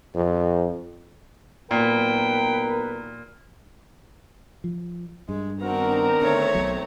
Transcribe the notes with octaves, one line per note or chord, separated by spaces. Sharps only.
F2
B1 A#2 A#4 B4 G5
F3
G2 G#3
D#3 B3 C4 D4 F#4 A#4 A#5
D3 A3 C#5
B1 B2 F#3